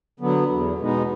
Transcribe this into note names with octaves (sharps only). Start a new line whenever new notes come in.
D3 F#3 B3
E2
B2 G#3 B3 D#4